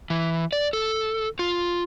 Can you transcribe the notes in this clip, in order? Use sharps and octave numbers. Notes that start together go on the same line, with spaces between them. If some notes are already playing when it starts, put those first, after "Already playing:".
E3
D5
A4
F4